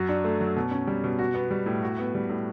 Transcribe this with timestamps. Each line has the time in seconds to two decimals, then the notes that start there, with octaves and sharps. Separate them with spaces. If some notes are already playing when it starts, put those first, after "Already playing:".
Already playing: F#2 F#4
0.09 D4
0.24 A3
0.41 F#3
0.56 B2
0.71 C#4
0.87 G3
1.04 B2
1.19 F#4
1.34 B3
1.51 G3
1.66 A2
1.83 F#4
1.99 B3
2.15 G3
2.29 A2